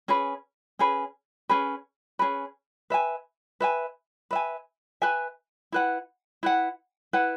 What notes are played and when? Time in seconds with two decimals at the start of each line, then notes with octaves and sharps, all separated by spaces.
0.08 C#4 G#4 B4
0.79 C#4 G#4 B4
1.49 C#4 G#4 B4
2.19 C#4 G#4 B4
2.90 B4 E5 G#5
3.60 B4 E5 G#5
4.31 B4 E5 G#5
5.02 B4 E5 G#5
5.72 E4 B4 F#5
6.43 E4 B4 F#5
7.13 E4 B4 F#5